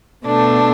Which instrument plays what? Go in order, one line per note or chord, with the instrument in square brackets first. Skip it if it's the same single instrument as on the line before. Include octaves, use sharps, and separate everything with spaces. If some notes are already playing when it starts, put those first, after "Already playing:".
[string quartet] B2 A3 D4